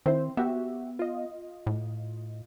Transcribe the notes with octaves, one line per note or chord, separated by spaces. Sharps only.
D#3 C4 E4 C5
B3 F#4 G4 E5
F4 D#5
A2